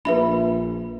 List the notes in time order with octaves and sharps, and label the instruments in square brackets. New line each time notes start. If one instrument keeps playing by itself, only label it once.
[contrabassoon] A#1 [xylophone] B4 E5 B5